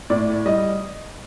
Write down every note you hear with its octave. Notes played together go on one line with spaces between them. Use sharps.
A2 D5
G3 D#5